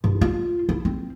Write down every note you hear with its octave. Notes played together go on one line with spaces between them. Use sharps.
G2
F4
E4
C4